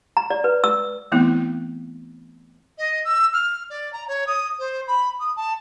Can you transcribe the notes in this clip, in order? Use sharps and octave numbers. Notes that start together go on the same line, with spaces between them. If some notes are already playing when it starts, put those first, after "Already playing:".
A#5
D5
B4
E6
E3 A3 B3 C4 E4
D#5
E6
F6
D5
A#5
C#5
D#6
C5
B5
D#6
A5